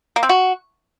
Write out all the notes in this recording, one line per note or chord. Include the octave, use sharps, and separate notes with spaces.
A#3
C4
F#4